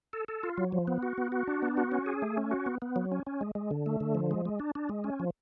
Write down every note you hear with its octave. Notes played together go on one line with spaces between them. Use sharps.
A4
A4
F4
F#3
F3
B3
F#4
B3
F#4
D4
B3
F#4
C#4
G#4
A3
C#4
F#4
B3
B3
F#3
C#4
C#4
G#3
G#3
D3
A3
D3
F3
G#3
G#3
D4
D4
G#3
C#4
F3